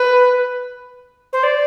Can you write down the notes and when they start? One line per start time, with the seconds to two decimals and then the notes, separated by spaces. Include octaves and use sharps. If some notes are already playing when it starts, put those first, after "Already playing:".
Already playing: B4
1.33 C5
1.43 D5